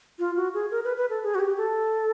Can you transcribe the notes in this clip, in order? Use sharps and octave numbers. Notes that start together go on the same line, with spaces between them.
F4
F#4
G#4
A#4
B4
B4
A4
G#4
F#4
G4
A4